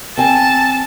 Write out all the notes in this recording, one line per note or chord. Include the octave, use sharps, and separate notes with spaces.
C4 G#5 A5